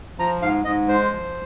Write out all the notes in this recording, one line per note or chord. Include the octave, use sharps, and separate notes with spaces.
F3 A#5
G#2 F5
G#2 D#5
G#3 C5
F3